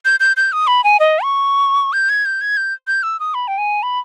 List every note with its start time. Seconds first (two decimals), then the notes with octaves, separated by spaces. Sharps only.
0.05 G6
0.20 G6
0.37 G6
0.52 D#6
0.67 B5
0.84 G#5
1.00 D#5
1.23 C#6
1.93 G6
2.09 G#6
2.25 G6
2.41 G#6
2.57 G6
2.87 G6
3.03 E6
3.20 D#6
3.34 B5
3.48 G5
3.58 G#5
3.83 B5